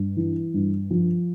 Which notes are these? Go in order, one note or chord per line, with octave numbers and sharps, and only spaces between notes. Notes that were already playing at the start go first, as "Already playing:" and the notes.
Already playing: G2
E3
G2
F3